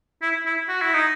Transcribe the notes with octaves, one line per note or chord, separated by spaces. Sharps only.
E4
E4
F#4
E4
D#4